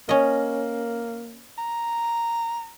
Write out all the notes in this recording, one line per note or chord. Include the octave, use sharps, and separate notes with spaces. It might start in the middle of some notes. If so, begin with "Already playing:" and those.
A#3 C#4 D#5
A#5